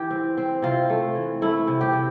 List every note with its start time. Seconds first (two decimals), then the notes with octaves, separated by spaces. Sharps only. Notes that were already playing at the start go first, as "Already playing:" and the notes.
Already playing: E3 G4
0.10 C4
0.38 C4
0.62 C3 F4
0.90 A3
1.15 E3
1.42 A3 E4
1.68 C3
1.81 G4
1.93 C3